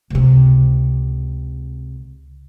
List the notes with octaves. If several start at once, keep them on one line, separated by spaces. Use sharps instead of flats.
C#2 C3